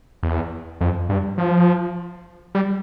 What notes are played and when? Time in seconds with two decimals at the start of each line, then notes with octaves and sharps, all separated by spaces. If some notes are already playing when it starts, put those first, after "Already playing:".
0.23 E2
0.81 F2
1.09 G2
1.38 F3
2.55 G3